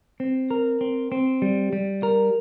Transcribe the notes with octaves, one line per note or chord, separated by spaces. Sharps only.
C4
A#4
C4
C4
G3
G3
A#4